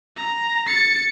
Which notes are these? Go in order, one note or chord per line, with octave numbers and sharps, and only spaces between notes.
A#5
A6 C#7